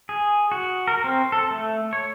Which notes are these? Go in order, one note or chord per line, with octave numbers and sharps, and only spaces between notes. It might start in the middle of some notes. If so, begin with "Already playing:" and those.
G#4
F#4
A#4
C4
A4
A3
C#5